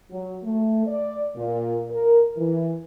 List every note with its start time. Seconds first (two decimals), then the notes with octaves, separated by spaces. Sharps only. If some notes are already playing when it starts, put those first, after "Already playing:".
0.11 F#3
0.43 A3
0.87 D5
1.35 A#2
1.90 A#4
2.37 E3